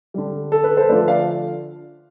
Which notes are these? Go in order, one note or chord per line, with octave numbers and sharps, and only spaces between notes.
D3 G3
A4
B4
A4 C5
D3 F3 A3 B4 D5
D5 F5